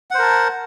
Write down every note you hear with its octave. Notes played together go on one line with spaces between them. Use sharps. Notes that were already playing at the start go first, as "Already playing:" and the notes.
A#4 C5 F#5 A5